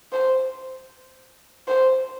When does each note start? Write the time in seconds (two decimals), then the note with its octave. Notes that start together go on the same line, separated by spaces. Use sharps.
0.13 C5
1.68 C5